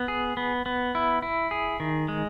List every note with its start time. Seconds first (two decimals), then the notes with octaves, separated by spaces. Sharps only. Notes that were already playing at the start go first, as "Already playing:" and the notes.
Already playing: B3
0.08 G#4
0.37 B3
0.66 B3
0.95 E4
1.22 E4
1.51 G#4
1.80 D#3
2.08 G#3